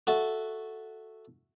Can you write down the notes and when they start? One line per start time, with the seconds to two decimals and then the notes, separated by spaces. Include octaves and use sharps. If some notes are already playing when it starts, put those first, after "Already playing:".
0.07 F#4 A4 E5